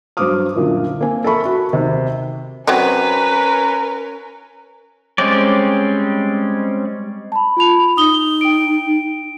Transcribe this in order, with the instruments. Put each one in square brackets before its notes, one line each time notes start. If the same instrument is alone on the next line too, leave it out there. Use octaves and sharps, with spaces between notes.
[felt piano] G2 F#3 C5 D6 D#6 F6
F#1 A#2 D3
A#3 C4 C5 G#5
A4 A#4 E5 A5 B5 C#6
F#4 B5
D#2 C3
[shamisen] F#3 C4 D#4 [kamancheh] C#4 A#4 [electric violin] B4
[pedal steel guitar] G3 G#3 C4 C#4 D5
[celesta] A5 B5
F4 B5 F7
[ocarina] D#4 [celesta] D#6 G7
[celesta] G5 D7